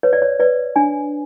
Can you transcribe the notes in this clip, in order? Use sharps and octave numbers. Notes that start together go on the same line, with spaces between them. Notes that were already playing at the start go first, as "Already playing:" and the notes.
B4 C#5
D5
C#5
B4 D5
D4 G#5